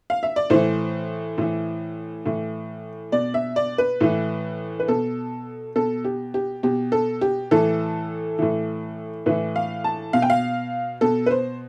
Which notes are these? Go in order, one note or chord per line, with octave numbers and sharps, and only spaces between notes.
F5
E5
D5
A2 E3 C5
A2 E3
A2 E3
B2 D5
E5
D5
B4
A2 E3
B4
B2 A4
B2 A4
G4
G4
B2 G4
A4
G4
A2 E3 A4
A2 E3
A2 E3 B4
F5
A5
B2 F5
G5
F5
B2 A4
B4
C5